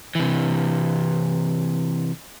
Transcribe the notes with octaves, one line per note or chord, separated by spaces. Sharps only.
C3 E3